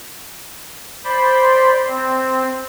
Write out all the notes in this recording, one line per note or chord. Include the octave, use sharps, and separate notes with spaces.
C5 D5 B5 C6
C4